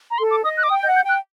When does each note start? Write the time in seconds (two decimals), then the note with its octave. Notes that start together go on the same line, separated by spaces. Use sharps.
0.11 A#5
0.18 A4 C6
0.31 D6
0.44 D#5 D#6
0.57 F#6
0.63 D6
0.69 G5 D#6
0.82 D#5 G6
0.87 F#5
0.96 G6
1.04 G5 F#6